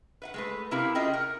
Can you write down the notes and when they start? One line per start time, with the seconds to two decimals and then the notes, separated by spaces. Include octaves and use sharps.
0.22 B4 E5 F#5
0.34 G#3 A3 B4
0.71 C3 C4 E4 G4 A#4 F5
0.95 C#4 F4 G#4 D#5 E5 G5
1.14 A#4 F#5